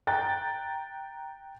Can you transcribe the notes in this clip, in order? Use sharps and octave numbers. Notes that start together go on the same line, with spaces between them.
G5 A#5 F#6 A6